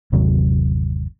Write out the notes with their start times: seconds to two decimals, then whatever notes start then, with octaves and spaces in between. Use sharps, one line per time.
0.12 G1 D#2 C3 F#3